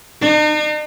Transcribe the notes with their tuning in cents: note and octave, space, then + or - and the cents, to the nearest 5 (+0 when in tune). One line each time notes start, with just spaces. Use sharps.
D#4 -45